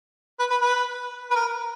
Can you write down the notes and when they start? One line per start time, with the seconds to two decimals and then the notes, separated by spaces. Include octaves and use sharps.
0.39 B4
0.50 B4
0.61 B4
1.31 B4
1.35 A#4